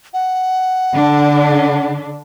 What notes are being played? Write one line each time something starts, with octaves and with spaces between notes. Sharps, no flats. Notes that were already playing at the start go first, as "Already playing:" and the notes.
F#5
D3 D4